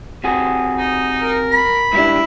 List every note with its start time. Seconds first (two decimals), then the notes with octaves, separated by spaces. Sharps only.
0.24 C3 F#4 G#4
0.77 D#4
1.22 A#4
1.52 B5
1.93 G#2 G3 D4 E4